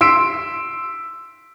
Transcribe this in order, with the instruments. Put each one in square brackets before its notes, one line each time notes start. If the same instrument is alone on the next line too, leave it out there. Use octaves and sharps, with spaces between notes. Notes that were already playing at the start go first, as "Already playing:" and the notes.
[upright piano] C6 E6 B6 D7